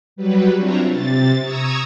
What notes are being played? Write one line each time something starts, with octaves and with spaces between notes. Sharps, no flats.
F#3 G3 B4
C4 D4 F4 C#5 E5 A#5
C3 A6
A#5 C#6 D#6 E6 G#6